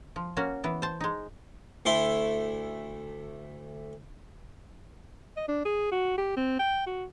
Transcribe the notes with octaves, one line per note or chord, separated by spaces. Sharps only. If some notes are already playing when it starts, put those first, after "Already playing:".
F3
A#3 C#4 F#4
E3 B3
C5 A5
G#3 D#4
D2 A3 E4 C6
D#5
D4
G#4
F#4
G4
C4
G5
F#4